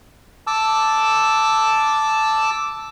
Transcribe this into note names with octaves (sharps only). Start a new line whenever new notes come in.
A5 D6 E6